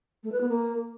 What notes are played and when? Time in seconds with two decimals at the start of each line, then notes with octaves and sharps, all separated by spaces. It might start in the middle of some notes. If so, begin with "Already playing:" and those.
0.23 A3
0.32 B4
0.40 B3
0.49 A#3